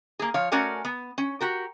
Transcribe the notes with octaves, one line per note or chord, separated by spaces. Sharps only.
A#3 G#4
F3 C#5 F5
A3 C#4 F#4 A#4 D5 G#5
B3
C#4
F#4 G4 A#4